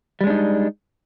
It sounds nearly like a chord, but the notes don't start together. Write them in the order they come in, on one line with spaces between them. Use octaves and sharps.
G3 G#3 D4 D#4